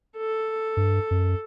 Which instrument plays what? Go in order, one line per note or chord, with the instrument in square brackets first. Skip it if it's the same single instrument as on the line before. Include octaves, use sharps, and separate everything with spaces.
[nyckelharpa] A4
[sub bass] G2
F#2